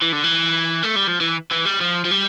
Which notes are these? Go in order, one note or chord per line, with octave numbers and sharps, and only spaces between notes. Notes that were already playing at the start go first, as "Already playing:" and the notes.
E3
D3
E3
A3
G3
F3
E3
E3
G3
F3
F3
G3